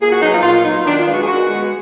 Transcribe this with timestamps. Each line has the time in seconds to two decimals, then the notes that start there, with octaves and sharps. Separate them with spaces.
0.01 A#2 G#4
0.12 F#4
0.22 F#3 B3 D#4
0.32 F4
0.43 A#2 F4
0.64 F#3 B3 D#4
0.85 D#3 D4
0.99 F4
1.06 G#3 B3
1.13 F#4
1.21 G#4
1.27 D#3 F#4
1.48 G#3 B3